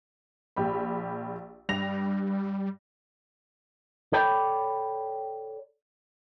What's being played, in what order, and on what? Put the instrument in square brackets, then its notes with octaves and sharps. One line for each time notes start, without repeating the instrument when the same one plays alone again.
[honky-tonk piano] A#1 G4 B5
[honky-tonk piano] G2 A#6 F7 [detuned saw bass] G3
[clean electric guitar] A4 C#5 D5 G5 A5 B5